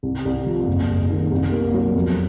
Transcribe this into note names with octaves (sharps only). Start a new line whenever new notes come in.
C2
C2
F3
F#1
F#1
D#3
C2
A#3
F#3
F2